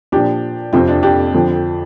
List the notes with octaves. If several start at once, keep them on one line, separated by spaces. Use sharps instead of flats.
A#2 F3 D4 G4
F2 C3 F3 C4 F4
D4
D4 G4
F2 D3 F3